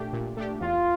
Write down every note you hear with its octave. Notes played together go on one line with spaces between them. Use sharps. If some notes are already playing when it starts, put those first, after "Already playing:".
Already playing: A#2 A3 D4 G4
A#2
A3 D4 G4
E2 F4